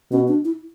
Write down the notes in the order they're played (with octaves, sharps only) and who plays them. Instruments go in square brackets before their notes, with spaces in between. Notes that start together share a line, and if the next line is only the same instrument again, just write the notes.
[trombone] B2 [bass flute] C#4
[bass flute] D4
E4